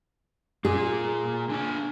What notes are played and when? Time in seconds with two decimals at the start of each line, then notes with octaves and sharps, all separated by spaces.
0.65 A#3 F4 G#4
1.50 D3 D4 G#5